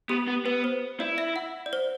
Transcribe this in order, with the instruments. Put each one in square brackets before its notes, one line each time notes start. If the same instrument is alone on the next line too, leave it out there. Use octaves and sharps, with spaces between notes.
[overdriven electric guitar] B3 [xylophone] G4
[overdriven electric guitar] B3
[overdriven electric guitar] B3 [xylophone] B4
[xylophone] C5
[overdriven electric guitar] E4 [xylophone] D5
[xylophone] E5
F#5
D5
C5